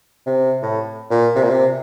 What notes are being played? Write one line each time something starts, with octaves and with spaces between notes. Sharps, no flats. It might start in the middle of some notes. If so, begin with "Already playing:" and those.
C3
A2
A#2
C3
A#2
C3